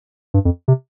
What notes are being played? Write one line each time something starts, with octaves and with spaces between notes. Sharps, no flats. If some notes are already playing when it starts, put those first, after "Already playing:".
G2
F2
C3